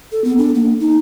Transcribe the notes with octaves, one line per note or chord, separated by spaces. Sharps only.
A4
B3
D4
A#3
D#4